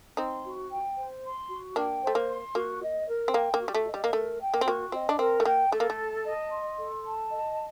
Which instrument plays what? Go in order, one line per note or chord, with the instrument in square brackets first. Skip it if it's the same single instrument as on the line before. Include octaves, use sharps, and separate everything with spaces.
[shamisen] C4 D#4 [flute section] C6
[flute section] F#4
G5
C5
C6
F#4
[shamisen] A#3 D4 [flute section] G5
[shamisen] A3 [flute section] C5
[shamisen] A#3
[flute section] C6
[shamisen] A#3 [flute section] F#4
[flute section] D#5
A#4
[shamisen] C4
[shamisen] A#3 [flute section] G5
[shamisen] A#3
[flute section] F#4
[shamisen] G3
A3
[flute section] D#5
[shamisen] G3
A#3
[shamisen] A3 [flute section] A#4
[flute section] G5
[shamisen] A#3
C4
[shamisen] A#3 [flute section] F#4
[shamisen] C4 [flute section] D#5
[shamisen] D4
[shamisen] C4 [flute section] A#4
[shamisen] A3
[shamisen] A#3 [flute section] G5
[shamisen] A3 [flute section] A4
[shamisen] A#3
A3
[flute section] A5
D#5
C6
A4
A5
D#5